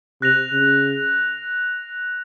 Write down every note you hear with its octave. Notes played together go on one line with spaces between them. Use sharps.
C3 F#6 A#6 F7
C#3